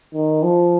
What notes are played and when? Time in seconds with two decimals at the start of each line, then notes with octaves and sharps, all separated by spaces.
0.14 D#3
0.43 F3